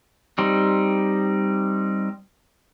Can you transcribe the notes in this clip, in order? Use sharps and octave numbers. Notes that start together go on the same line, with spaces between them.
G3 C4 D#4